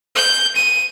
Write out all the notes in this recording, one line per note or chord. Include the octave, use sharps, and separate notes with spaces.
G6
D#7